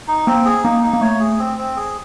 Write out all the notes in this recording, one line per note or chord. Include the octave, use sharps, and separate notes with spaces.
D#4
A#3 C4
G#4
A#3 D#4
D#4
A#3
A3 C#5
G#4
C4
C4
G#4